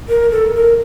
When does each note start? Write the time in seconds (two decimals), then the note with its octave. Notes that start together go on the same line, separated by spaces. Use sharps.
0.09 A#4
0.31 A4
0.54 A#4